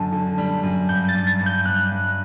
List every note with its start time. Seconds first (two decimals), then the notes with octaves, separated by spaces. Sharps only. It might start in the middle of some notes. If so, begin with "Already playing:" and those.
Already playing: F#2 D3 A5
0.12 D3
0.38 G3
0.63 F#2
0.89 G2 G6
1.09 A6
1.15 G2
1.27 A6
1.40 G2
1.46 G6
1.65 G2 F#6
1.92 G2